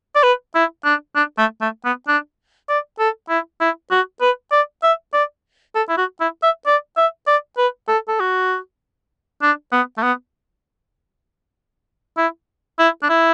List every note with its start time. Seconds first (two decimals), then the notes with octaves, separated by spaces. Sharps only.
0.16 D5
0.23 B4
0.55 E4
0.85 D4
1.16 D4
1.38 A3
1.61 A3
1.85 B3
2.08 D4
2.69 D5
2.99 A4
3.29 E4
3.61 E4
3.91 F#4
4.21 B4
4.52 D5
4.83 E5
5.14 D5
5.75 A4
5.89 E4
5.98 F#4
6.21 E4
6.43 E5
6.67 D5
6.97 E5
7.27 D5
7.58 B4
7.88 A4
8.08 A4
8.20 F#4
9.43 D4
9.72 B3
9.98 A3
10.03 B3
12.18 E4
12.79 E4
13.03 D4
13.09 E4